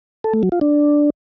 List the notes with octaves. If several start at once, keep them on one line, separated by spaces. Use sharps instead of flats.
A4
A3
F#3
F4
D4